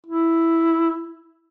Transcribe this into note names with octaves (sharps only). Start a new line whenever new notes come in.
E4